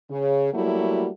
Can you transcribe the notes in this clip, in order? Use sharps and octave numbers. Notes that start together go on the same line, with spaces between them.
C#3
F#3 G3 A3 A#3 E4 F#4